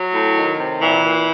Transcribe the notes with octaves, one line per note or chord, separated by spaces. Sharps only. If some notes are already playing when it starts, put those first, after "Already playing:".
Already playing: F#3
A2
D#3
C3
A#2 E3
A#2